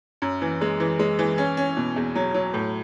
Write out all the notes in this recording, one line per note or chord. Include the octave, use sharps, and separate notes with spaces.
F#2
E3
G#3
E3
G#3
E3
C#4
C#4
B2
E2
F#3
F#3
A2